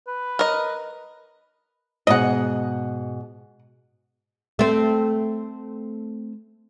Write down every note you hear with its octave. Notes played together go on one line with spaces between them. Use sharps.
B4
A#4 D#5
G#2 B2 G#4 D#5 F#5
A3 C4